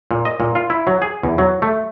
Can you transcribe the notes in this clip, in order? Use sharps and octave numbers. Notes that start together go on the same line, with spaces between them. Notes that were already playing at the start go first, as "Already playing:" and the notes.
A#2
D#5
A#2
F4
E4
F#3
G#4
E2
F#3
A3